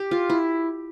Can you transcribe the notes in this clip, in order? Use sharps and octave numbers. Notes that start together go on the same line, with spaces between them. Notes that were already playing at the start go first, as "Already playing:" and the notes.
Already playing: G4
F4
E4